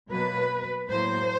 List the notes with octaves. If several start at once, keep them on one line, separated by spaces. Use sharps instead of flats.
B2 F#3 A#3 B4
A2 F#3 A#3 C5